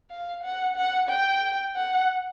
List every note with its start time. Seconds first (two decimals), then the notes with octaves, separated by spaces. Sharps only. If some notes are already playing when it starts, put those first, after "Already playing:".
0.11 F5
0.43 F#5
0.76 F#5
1.10 G5
1.76 F#5